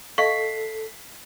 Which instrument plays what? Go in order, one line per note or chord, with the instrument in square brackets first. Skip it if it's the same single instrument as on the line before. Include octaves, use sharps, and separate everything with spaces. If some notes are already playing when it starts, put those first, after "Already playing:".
[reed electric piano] A4 [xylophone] D#5 F5 C#6 [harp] B6 C7